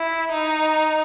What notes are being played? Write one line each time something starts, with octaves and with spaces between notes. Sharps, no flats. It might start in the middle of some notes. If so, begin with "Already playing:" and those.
Already playing: E4
D#4